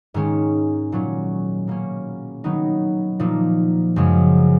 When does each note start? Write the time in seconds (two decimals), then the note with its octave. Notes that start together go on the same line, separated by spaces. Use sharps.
0.14 G#2 D#3 G#3 C#4
0.92 A#2 F#3 C#4
1.67 B2 A#3 C#4
2.44 D#3 F#3 B3 D#4
3.19 A#2 F3 A#3 D#4
3.96 F#2 C#3 F3 G#3